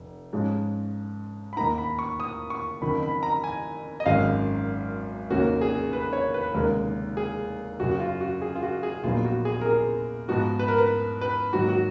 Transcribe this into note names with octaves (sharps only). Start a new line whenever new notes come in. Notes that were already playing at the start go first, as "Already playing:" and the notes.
Already playing: F1
G#2 F3 G#3 C#4
B5
D#2 D#3 A#3 D#4 A#5
B5
C#6
D#6
C#6
F#1 F2 D#3 B5
B5
A#5
G#5
D#5
G#1 F#2 D#3 G#3 F5
F1 D#2 D#3 A#3 C#4 F#4
G#4
B4
C#5
B4
F1 D#2 C#3 G#3 A#4
G#4
F#1 F#2 C#3 F#4
F#4
F4
F#4
G#4
F4
F#4
G#4
A#1 A#2 F#3 B3 D#4 F4
F#4
G#4
A#4
G#4
G#2 F3 B3 D#4 F#4
B4
A#4
B4
B4
G#2 D#3 F#3 A#3 F#4
F#4